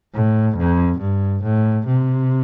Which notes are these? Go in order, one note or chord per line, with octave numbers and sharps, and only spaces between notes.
A2
F2
G2
A2
C3